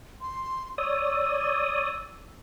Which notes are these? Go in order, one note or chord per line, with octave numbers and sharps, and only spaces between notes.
C6
C#5 D5 D#6 E6